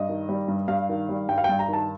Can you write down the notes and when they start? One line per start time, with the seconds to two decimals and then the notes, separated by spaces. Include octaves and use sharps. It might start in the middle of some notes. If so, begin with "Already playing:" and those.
Already playing: G2 D#5
0.09 D#3
0.29 G3
0.48 G2
0.68 G2 F5
0.89 D#3
1.09 G3
1.28 G2 G5
1.38 F5
1.44 G2 G5
1.59 A#5
1.68 D#3 A5